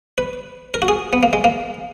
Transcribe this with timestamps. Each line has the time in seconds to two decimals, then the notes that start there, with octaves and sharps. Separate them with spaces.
0.18 B4
0.74 A#4
0.82 F#4
0.88 G#4
1.13 B3
1.23 A#3
1.33 G#3
1.44 A#3